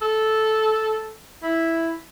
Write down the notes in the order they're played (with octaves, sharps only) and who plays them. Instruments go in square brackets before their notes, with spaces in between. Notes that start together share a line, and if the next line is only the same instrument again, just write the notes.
[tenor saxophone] A4
E4